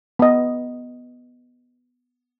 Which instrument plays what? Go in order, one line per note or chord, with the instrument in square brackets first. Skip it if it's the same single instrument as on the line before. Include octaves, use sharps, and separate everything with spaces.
[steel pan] B3 D#5